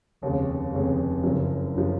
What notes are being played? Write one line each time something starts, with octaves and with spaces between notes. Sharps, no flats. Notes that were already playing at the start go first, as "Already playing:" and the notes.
F1 D#2 C#3 G#3
F1 D#2 C#3 G#3
F#1 F#2 C#3 F3
F#1 C#3 F3